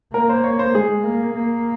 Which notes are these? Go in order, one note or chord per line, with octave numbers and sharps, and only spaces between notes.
A#3 A#4
C5
C#5
C5
G#3 G#4
A#3
A#3